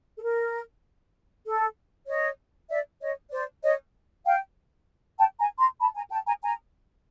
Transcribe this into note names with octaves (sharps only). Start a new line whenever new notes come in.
A4
A#4
A4
C#5 D#5
D5 E5
C#5 D#5
C5 D5
C#5 D#5
F5 G5
G5 A5
G#5 A#5
A#5 C6
A5 B5
G#5 A#5
G5 A5
G#5 A#5
G#5 A#5